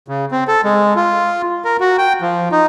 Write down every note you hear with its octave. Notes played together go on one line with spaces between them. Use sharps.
C#3
C4
A4
G#3
F4
A#4
F#4
G5
F3
D#4